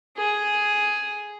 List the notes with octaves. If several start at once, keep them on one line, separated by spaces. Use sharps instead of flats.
G#4